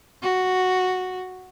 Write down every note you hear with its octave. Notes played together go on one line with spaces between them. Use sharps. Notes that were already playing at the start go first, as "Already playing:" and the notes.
F#4